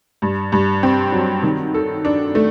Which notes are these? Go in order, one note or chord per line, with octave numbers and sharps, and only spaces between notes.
G2
G2
C4
F#3
D#3
A4
D4
A3